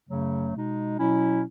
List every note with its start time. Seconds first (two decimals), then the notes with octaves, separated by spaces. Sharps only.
0.09 F#2 C#3 F#3 A3
0.53 B2 G#3 D#4
0.97 B2 F#3 C#4 E4